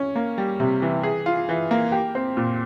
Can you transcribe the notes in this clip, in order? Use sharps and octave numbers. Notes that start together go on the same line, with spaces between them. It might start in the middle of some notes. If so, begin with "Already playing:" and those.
Already playing: C#4
A#3
G3
C3
E3
G#4
F4
E3
A#3
G4
C4
A#2